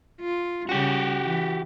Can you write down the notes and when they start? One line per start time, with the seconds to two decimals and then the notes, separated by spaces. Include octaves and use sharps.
0.21 F4
0.69 C#3 G3 F#4 G4
1.23 E3